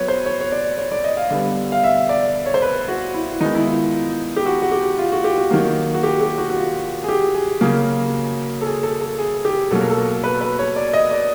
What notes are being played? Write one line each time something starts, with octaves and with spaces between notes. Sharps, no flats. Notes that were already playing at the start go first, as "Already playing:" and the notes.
Already playing: F#3 B3 B4 C#5
C5
C#5
C#5
D5
C#5
D5
D#5
F5
D3 G3 B3
F5
E5
D5
C#5
C5
B4
F#4
E4
D#3 G#3 B3 D#4
E4
F4
G4
F#4
F#4
G4
F4
F#4
G4
F#4
D#3 F#3 A#3
F#4
G4
G4
F#4
F#4
F4
G#4
G4
G#4
C#3 F#3 A#3
A4
G#4
A4
A4
G#4
G4
B2 F#3 A#3 A4
A#4
A4
B4
B4
C#5
D5
D#5
D5